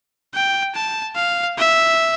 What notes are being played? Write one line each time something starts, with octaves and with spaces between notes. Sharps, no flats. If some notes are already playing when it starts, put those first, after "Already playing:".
G5
A5
F5
E5